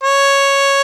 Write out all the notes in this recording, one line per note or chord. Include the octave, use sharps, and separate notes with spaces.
C#5